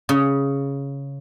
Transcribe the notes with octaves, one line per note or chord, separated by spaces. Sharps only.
C#3